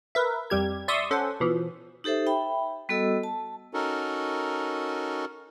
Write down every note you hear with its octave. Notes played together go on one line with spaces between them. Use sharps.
A#4 B4 E5
F2 G3 G4 G#6
D5 E5 C6 C#6 D#6 E6
C#4 A4 C5 F#5
B2 E3 F3
D#4 G4 A4 C5 E5
E5 G5 B5
G3 B3 F#4 A4 D#5 E6
A5
C#4 D#4 F#4 A4 A#4